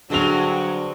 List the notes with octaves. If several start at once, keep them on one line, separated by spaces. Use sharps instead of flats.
G2 D3 F#3 G#3 C4 F#4 F7